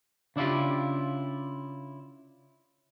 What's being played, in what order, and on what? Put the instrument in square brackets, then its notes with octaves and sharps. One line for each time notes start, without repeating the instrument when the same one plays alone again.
[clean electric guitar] C#3 D4 E4 F4 G4